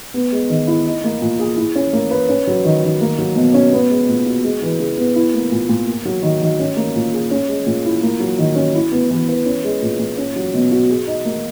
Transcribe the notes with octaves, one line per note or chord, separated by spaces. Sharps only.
B3
G#3
D#3
E4
D#4
A#3
A#2
G#4
E4
C#4
A#3
B4
C#4
F#3
D#3
D#3
A#3
F#3
B2
C#4
B3
G#3
A#2
F#4
G#3
E3
C#3
B3
E4
A#3
A#2
A#2
A#3
F#3
D#3
D#3
C#4
A#3
A#2
G#4
C#4
G#3
A#2
E4
A#3
F#3
D#3
C#4
E4
B3
E3
B4
C#4
G#3
A#2
A#2
C#4
F#3
B2
F#4
G#4
D#4
A#3